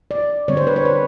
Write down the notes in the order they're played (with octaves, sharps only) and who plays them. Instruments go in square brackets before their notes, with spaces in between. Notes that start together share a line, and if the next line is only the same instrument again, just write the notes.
[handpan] D5
D3 G3 C4 C#5
C5
B4
C#5
B4